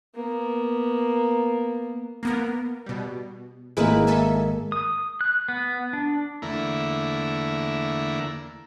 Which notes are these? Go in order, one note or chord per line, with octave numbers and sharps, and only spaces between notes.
A#3 B3
A#3 B3 A#4
B2 G3
G#1 G#3 A#3 E4 G#4 A#4 B4
A4 E5 G#5
D#6
F#6
B3
D4
E2 D3 A3 A#3 E4 A#5